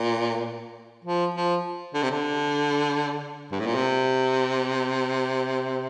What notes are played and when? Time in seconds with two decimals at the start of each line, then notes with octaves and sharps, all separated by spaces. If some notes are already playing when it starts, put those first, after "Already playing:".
Already playing: A#2
1.04 F3
1.34 F3
1.94 D3
2.03 C3
2.11 D3
3.52 G2
3.59 A2
3.66 A#2
3.75 C3